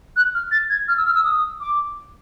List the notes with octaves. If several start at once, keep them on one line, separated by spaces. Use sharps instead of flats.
F#6
F6
A6
G#6
F6
E6
F6
E6
D#6
D6